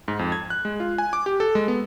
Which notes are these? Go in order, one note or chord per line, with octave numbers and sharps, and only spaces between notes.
G#2
F2
G#6
F#6
G#3
F4
G#5
D6
G4
A4
G#3
B3